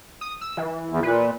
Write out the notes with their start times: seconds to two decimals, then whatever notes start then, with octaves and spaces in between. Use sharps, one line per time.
0.21 D#6
0.41 E6
0.57 E3
0.89 E2
1.03 A#2 B4